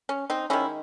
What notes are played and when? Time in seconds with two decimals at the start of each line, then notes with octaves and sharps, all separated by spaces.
0.09 C#4
0.30 C4 D#4
0.50 D#3 G#3 C#4 E4